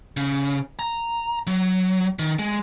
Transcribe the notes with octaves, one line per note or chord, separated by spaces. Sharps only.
C#3
A#5
F#3
D#3
G#3